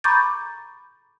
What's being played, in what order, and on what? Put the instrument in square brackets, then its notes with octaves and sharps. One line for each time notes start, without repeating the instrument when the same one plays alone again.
[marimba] A#5 B5 C#6 D6 G6 A6